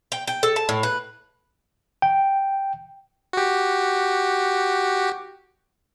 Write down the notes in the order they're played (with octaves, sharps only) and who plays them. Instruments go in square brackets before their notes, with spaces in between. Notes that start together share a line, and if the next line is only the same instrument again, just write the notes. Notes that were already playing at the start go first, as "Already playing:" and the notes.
[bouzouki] G5
G5
A4
A5
A2
B4
[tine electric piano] G5
[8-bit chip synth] F#4 G4